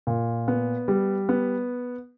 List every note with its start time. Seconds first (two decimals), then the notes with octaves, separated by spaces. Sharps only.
0.07 A#2
0.48 B3
0.88 G3
1.29 B3